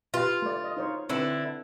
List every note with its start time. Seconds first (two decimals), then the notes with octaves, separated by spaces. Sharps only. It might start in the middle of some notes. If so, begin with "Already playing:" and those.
0.14 F4 G4 B4
0.42 A3 D5
0.64 D#5
0.77 D#4 C5 C#5
1.09 D3 C4 E4 B4